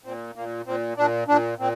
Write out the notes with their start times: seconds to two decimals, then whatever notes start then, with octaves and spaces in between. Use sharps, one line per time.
0.04 A#2 C4
0.35 A#2 A#3
0.66 A#2 C4
0.97 A#2 D4
1.28 A#2 D4
1.58 A#2 C4